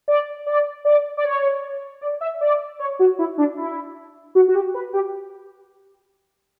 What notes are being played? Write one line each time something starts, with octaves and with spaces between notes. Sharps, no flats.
D5
D5
D5
D5
C#5
D5
E5
D5
C#5
F#4
E4
D4
E4
F#4
F#4
G4
B4
G4